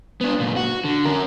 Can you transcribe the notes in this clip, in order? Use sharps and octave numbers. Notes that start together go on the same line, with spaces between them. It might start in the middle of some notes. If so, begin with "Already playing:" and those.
B3 D4
F#2 A#2
F#4
D3
C#4 A#4